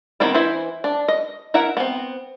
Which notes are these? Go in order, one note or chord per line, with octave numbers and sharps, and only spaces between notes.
D#3 B3 C4 E4
E3 E4 C5 E5
D4
D#5
E4 A#4 E5 F#5
B3 C4